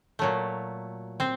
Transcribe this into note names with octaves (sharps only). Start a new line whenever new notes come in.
A#2 F#3 A3
C4 C5